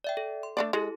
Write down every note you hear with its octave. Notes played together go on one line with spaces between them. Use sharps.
D5 E5 G5
A4
C6
A3 D4 D5
G#3 E4 G4 A4